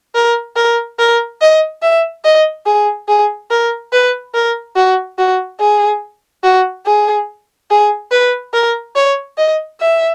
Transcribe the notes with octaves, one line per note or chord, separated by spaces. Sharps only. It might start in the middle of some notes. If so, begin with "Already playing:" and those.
A#4
A#4
A#4
D#5
E5
D#5
G#4
G#4
A#4
B4
A#4
F#4
F#4
G#4
F#4
G#4
G#4
B4
A#4
C#5
D#5
E5